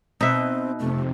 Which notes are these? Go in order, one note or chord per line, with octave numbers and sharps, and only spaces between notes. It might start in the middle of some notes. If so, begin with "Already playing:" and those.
B2 C4 D#4 E5
F2 C3 A3